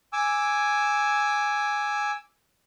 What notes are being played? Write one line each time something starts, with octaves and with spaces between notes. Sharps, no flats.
G#5 D6 E6